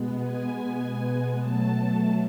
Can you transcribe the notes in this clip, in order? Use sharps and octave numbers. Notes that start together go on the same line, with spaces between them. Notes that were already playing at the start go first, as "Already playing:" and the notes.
Already playing: B2 G#3 B3
G#5
B2 F#3 A3 A5